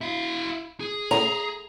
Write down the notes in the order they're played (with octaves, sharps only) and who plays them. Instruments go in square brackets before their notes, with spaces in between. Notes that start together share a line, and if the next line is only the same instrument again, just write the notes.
[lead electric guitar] E4 F5
G#4
[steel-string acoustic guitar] A#5